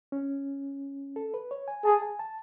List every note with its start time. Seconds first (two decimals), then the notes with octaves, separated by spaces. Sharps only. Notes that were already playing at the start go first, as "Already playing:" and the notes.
0.12 C#4
1.16 A4
1.34 B4
1.51 C#5
1.68 G#5
1.85 G#4 A5
2.02 G#5
2.19 A5